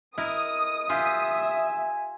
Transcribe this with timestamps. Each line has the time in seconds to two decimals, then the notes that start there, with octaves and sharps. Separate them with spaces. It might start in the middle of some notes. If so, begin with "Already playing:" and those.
0.18 E4 A#4 D#5 D#6
0.89 F4 G4 E5 G#5